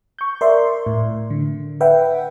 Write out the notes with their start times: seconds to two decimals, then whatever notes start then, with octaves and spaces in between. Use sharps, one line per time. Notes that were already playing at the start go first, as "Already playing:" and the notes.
0.19 C#6 G6
0.41 A#4 D5 E5 C6
0.86 A2
1.30 D3
1.81 B4 E5 F#5 G5